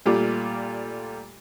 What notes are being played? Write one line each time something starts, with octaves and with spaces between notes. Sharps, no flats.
A#2 G3 A3 F4 D6